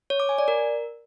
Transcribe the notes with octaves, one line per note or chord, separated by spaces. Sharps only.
C#5
D6
G#5
D5
A#4